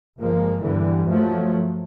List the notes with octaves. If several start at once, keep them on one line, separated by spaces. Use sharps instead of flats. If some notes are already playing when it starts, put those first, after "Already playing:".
G1 F3 G#3 A#3
E2 G2 D3 E3 G3
D#2 F3 F#3 A3